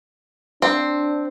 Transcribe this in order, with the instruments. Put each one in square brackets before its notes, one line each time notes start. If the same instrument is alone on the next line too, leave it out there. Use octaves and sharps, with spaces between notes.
[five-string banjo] C4 [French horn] D4